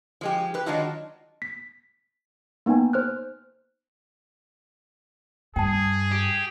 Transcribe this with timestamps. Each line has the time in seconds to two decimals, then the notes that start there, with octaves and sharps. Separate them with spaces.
0.21 F3 G#3 G4
0.54 G4 B4
0.66 D#3 F#3 G#3 D4 D#4 F4
1.42 B6
2.66 A#3 B3 D#4 G5 G#5
2.93 C5 F6 F#6
5.56 G2 G#4 G5 A5
6.11 G4